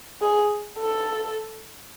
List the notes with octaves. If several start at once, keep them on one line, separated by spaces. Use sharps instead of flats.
G#4
A4